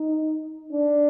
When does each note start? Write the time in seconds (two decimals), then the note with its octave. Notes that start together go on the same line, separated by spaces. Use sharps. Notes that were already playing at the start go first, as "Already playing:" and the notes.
Already playing: D#4
0.73 D4